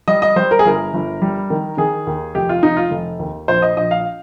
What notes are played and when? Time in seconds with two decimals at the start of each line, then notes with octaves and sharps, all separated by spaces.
0.08 G3 D#5
0.22 D#5
0.36 G3 C5
0.51 A#4
0.59 G#4
0.65 G1 A#4
0.94 G1
1.22 G3
1.50 D#3
1.78 D#3 G#4
2.07 D#2
2.35 F1 G4
2.49 F4
2.63 F1 D#4
2.77 F4
2.91 F1
3.19 D#2
3.48 A#1 C5
3.62 D#5
3.77 A#1 D#5
3.91 F5